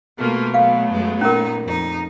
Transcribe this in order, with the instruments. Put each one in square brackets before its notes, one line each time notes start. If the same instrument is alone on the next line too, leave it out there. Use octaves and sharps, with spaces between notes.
[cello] B2 [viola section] A3 A#3 F4
[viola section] F#3 A3 B3 [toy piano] F5
[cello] F#2 G#3
[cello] A#2 D#4 [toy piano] C#4 A#4
[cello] F2 D#4